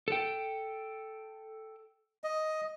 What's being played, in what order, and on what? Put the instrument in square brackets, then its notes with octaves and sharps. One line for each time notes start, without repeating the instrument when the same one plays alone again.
[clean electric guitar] A4 G5
[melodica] D#5